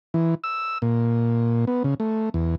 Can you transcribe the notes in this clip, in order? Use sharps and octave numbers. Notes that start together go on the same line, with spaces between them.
E3
E6
A#2
B3
C#3
A3
E2